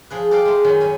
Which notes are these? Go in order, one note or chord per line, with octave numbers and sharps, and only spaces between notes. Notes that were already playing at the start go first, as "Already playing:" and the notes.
F3 G#4 B4
G4 A4 B4 D5 F5
G#3 A3
F#2 D#3 C#4
C#4 G#5 B5